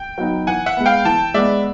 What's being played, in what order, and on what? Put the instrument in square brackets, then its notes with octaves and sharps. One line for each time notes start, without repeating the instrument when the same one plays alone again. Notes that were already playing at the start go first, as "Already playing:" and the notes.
Already playing: [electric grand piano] G5
[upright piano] F#3 B3 D#4
[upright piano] E3 [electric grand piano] F#5 G#5
[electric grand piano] E5 F#5
[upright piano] G#3 B3
[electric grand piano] F5 G5
[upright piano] E3 [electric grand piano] G5 A5
[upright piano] G#3 B3 [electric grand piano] D5 E5